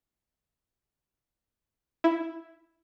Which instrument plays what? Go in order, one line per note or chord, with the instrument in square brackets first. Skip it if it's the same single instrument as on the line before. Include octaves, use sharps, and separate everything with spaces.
[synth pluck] E4